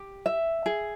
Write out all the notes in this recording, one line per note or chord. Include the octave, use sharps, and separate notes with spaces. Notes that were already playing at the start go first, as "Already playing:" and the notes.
Already playing: G4
E5
G#4